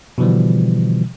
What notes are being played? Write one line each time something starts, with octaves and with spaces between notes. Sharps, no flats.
B2 D3 E3 F3 G3